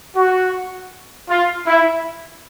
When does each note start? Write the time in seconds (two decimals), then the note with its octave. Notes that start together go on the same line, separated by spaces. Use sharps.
0.16 F#4
1.29 F4
1.67 E4